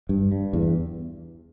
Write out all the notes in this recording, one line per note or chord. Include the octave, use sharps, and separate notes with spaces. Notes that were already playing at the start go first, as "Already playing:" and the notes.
G2
G2
E2